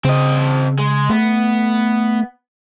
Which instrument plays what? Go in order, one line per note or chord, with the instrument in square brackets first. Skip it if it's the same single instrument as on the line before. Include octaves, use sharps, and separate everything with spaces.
[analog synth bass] C#3 [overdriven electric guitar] C4 D#5
[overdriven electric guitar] G#3
[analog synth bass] A3 [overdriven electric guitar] B3